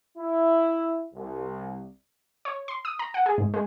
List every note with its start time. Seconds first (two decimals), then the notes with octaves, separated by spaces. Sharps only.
0.17 E4
1.14 C2
2.45 C#5
2.68 C6
2.85 D#6
2.99 A#5
3.14 F#5
3.26 G#4
3.38 G#2
3.54 G#3